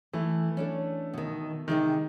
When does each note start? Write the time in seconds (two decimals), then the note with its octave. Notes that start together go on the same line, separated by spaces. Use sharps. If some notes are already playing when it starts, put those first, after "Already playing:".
0.13 E3 A3
0.57 C#4 D4 A4
1.13 B2 D#3
1.68 C3 D#3 G#3 D#4